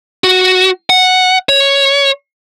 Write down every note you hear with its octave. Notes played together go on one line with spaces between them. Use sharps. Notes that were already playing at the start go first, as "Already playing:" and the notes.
F#4
F#5
C#5